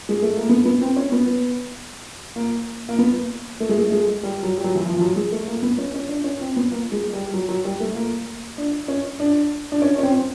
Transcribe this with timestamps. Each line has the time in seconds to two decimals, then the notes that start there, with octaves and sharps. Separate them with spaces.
0.09 G#3
0.22 A3
0.37 A#3
0.49 B3
0.66 B3
0.82 C4
0.96 C#4
1.12 B3
2.36 A#3
2.89 A#3
2.99 B3
3.60 A3
3.69 G#3
3.79 A3
3.92 G#3
4.23 G3
4.43 F#3
4.58 G3
4.64 F#3
4.75 E3
4.85 F3
4.97 F3
5.01 F#3
5.16 G#3
5.32 A3
5.48 A#3
5.63 B3
5.78 C#4
5.94 C#4
6.09 D4
6.24 C#4
6.41 C4
6.56 B3
6.72 A#3
6.92 G#3
7.13 G3
7.34 F#3
7.49 F#3
7.65 G3
7.80 A3
7.95 A#3
8.58 D4
8.88 C#4
9.20 D4
9.72 D4
9.82 C#4
9.99 C#4
10.03 C4